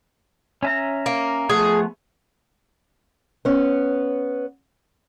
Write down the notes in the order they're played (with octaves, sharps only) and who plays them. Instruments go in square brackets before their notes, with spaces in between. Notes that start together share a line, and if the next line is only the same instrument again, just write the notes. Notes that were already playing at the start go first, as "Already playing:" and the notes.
[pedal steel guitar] C#4 E5 A#5
[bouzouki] A#3
[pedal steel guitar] F3 A3 B3 [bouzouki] G#4
[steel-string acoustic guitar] B3 C#4